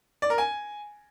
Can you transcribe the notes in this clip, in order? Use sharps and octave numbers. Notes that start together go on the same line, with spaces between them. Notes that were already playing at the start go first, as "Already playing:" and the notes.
D5
A#4
G#5